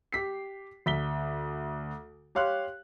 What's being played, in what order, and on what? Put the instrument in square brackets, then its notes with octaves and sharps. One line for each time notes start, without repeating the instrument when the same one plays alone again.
[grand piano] G4 B6 C7
D2 B6 G7
G4 C#5 F5 C6 F#6